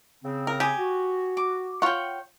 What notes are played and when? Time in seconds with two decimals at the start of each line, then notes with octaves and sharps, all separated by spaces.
0.23 C#3 C4
0.47 A#4
0.60 G4 G#5 D#6
0.78 F#4
1.37 D6
1.82 F4 C#5 F#5 G5